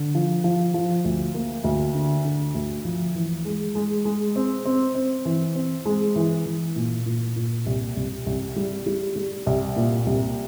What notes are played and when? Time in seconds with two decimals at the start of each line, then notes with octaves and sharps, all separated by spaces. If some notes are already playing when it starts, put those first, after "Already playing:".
Already playing: D3
0.15 F3
0.44 F3
0.74 F3
1.05 D2
1.34 A#3
1.64 D2
1.95 D3
2.25 D3
2.54 D2
2.85 F3
3.15 E3
3.45 G#3
3.75 G#3
4.05 G#3
4.36 C4
4.66 C4
4.95 C4
5.25 E3
5.56 C4
5.86 G#3
6.16 E3
6.46 E3
6.76 A#2
7.06 A#2
7.36 A#2
7.66 C2
7.96 C2
8.26 C2
8.56 G3
8.86 G3
9.16 G3
9.46 C2
9.76 A#2
10.07 C2